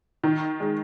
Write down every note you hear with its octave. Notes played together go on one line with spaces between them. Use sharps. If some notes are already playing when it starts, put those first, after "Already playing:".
D#3
G#3